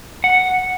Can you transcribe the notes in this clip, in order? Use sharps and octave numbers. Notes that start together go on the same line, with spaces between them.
F#5